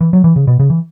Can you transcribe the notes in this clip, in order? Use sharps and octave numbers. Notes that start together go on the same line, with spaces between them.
E3
F#3
E3
C#3
B2
C#3
E3